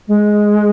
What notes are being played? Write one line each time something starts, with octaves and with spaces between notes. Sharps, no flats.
G#3